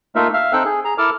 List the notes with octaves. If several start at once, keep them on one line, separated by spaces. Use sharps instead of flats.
A3 A#3 D#4 F4 A#4 E5
E5 F5 F6
C4 D#4 A4 G5 E6 F#6
G#4
G#4 A#5
E4 A4 A#4 A5 D6 F6